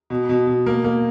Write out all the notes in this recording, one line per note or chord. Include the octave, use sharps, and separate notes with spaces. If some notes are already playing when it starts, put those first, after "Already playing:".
B2
B2
B2
A#3
A#3